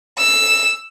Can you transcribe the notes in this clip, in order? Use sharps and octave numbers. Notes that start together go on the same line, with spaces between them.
E6